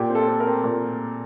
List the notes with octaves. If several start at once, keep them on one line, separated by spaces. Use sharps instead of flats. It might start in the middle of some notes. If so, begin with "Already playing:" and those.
Already playing: A#2 G4
C4
A4
C4
A#4
C4
A#2